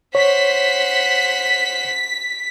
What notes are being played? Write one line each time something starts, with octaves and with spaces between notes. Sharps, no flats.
C5 C#5 F#5 B6